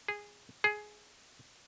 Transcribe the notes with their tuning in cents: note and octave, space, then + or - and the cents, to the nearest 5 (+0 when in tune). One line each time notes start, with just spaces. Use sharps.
G#4 -10
G#4 +15